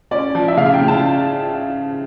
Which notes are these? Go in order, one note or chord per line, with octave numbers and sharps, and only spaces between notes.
C#4 D5
F3
E5
C#3 F5
G5
C#3
A5